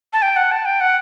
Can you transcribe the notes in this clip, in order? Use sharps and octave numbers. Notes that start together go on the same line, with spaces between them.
A5
G5
F#5
A5
G5
F#5